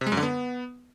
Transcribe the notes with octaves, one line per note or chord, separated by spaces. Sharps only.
C3
G#3
F#2
D3
B3